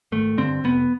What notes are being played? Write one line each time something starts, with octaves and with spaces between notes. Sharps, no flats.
G#1 A3
G2 D3 C4
F1 B3